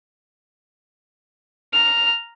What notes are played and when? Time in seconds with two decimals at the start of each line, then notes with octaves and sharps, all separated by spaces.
1.73 A#5 F6